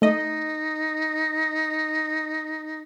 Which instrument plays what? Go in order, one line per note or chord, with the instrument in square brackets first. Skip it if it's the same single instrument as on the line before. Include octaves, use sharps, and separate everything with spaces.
[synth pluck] A3 D#5 [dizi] D#4